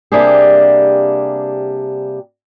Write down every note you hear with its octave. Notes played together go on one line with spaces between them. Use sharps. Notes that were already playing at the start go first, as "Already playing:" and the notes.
C3 G3 A#3 D4 G4 G#4